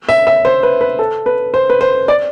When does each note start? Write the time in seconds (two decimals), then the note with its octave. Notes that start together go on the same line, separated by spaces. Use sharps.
0.09 E5
0.27 E5
0.45 C5
0.63 B4
0.81 B4
0.99 A4
1.26 B4
1.54 C5
1.70 B4
1.81 C5
2.08 D5